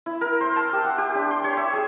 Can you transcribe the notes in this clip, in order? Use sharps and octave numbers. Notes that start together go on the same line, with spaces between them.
E4
A#4
C5
A5
G4
F#5
G4
D4
C6
C#5
E5
G#4